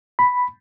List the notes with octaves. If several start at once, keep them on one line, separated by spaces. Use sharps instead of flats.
B5